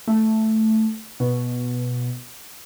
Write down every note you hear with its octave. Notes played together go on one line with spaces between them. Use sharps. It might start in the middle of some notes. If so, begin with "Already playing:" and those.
A3
B2